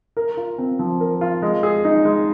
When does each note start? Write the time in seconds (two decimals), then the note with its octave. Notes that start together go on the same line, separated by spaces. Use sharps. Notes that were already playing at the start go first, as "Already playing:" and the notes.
0.17 A#4
0.37 F4
0.58 C4
0.79 F3
1.00 A#4
1.21 F4
1.42 G#3
1.63 G#4
1.84 D#4
2.05 G#3